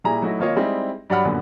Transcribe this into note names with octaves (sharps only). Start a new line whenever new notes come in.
A#2 G3 E4 G#4 A#5
F#3 A3 D#4 E4 F#4
G#1 A#3 F4 C#5 D#5 F5
G3 G#3 C4 D#4 E4
G2 F#3 D5 F#5 B5 F6
F#2 A#2 D3 B3